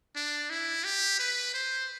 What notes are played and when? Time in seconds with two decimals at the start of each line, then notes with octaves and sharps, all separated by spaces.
0.16 D4
0.50 E4
0.84 G4
1.19 B4
1.54 C5